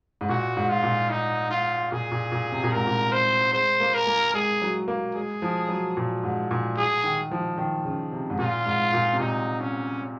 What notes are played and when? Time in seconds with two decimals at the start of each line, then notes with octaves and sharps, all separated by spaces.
0.21 G#2
0.29 A#2 F#4
0.57 G#2
0.69 F4
0.83 A#2
1.10 D#4
1.50 F4
1.92 A#2 G#4
2.11 A#2
2.32 A#2
2.52 C3
2.63 A#2
2.72 G#2 A#4
2.87 A#2
3.12 C5
3.53 G#3 C5
3.80 A#3
3.94 A#4
4.07 A#3
4.34 G#3 G#4
4.62 F#3
4.88 A#3
5.15 G#3 G#4
5.42 F3
5.69 F#3
5.97 A#2
6.23 G#2
6.51 A#2
6.77 G#4
7.04 D#3
7.31 F3
7.58 D#3
7.85 C#3
8.12 C3
8.30 G#2
8.39 A#2 F4
8.66 G#2
8.94 A#2
9.14 C3
9.20 A#2 D#4
9.60 C#4